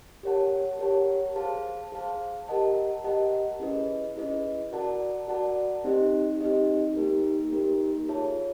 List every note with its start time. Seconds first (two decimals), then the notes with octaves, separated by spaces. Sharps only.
0.23 G4 A#4 C#5 F#5 A5
0.79 G4 A#4 C#5 F#5 A5
1.36 G#4 C5 F5 A5
1.92 G#4 C5 F5 A5
2.48 G4 A#4 D#5 F#5 A5
3.04 G4 A#4 D#5 F#5 A5
3.60 C#4 E4 G#4 B4 D#5
4.16 C#4 E4 G#4 B4 D#5
4.72 F#4 A#4 D5 F#5 A5
5.28 F#4 A#4 D5 F#5 A5
5.84 C4 D#4 G4 C5 D#5
6.41 C4 D#4 G4 C5 D#5
6.97 A#3 D#4 G4 A#4
7.52 A#3 D#4 G4 A#4
8.09 F4 G#4 C#5 E5 A5